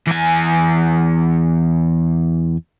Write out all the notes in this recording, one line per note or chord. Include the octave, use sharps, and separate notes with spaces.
E2 G#5